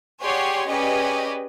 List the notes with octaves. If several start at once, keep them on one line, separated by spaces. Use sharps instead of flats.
G4 G#4 C#5 D5 F#5 C6
C#4 G4 G#4 B4 D5 D#5